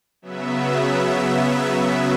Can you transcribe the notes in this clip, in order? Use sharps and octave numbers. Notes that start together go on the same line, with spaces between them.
C#3 F#3 B3 E5